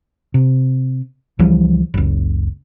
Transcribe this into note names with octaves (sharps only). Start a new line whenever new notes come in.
C3
C#2 E3 F3 G3
F#1 C#2